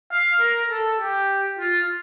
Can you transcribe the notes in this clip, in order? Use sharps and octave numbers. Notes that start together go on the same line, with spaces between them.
F5
A#4
A4
G4
F4